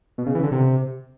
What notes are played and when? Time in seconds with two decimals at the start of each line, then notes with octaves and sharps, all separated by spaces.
0.18 B2
0.26 C#3
0.35 E3
0.43 D3
0.52 C3